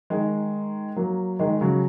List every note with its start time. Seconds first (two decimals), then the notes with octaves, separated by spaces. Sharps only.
0.10 D#3 G#3
0.96 F#3 A#3
1.39 D#3 G#3
1.61 C#3 F#3